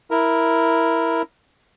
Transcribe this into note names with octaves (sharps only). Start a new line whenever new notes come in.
E4 A#4